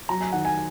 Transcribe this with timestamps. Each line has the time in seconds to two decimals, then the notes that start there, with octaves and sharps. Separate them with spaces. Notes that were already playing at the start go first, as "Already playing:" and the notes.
0.09 F#3 A#5
0.21 G#5
0.32 D#3 F#5
0.45 G#5